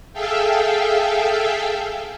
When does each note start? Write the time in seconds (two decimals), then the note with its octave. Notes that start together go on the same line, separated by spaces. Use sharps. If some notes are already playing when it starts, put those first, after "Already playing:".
0.13 G#4 A4 E5 F5 G5